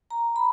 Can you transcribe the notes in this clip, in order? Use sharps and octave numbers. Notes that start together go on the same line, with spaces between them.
A#5
B5